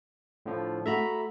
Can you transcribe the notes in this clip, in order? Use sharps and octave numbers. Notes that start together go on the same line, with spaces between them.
A2 D3 F3
A3 F#4 E5 A#5 B5